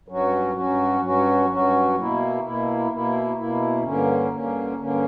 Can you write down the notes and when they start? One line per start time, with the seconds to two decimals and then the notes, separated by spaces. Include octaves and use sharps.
0.08 G2 F#3 C#4 F#4
0.55 G2 F#3 C#4 F#4
1.01 G2 F#3 C#4 F#4
1.49 G2 F#3 C#4 F#4
1.96 B2 A#3 E4
2.43 B2 A#3 E4
2.90 B2 A#3 E4
3.36 B2 A#3 E4
3.83 G2 D3 A#3 C#4
4.30 G2 D3 A#3 C#4
4.77 G2 D3 A#3 C#4